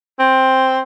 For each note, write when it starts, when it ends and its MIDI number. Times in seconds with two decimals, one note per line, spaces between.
0.19 0.81 60